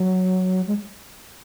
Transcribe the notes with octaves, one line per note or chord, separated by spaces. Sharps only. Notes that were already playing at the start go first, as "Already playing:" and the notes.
Already playing: F#3
G#3